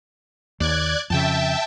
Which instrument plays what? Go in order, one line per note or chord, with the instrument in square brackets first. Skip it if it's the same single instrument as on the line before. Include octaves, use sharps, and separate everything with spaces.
[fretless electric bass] D#2 [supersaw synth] D5 F#6 G#6
[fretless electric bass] F2 C#3 [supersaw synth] E5 G5 A5